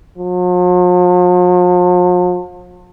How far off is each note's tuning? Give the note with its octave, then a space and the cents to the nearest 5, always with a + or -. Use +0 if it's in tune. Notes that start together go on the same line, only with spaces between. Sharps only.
F3 +45